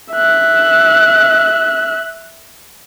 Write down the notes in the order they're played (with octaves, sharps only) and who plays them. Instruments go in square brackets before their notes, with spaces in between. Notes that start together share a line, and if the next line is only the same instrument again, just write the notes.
[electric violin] E5 F#6